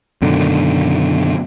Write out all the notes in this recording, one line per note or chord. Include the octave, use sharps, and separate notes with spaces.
F#2 B2 D3 D#3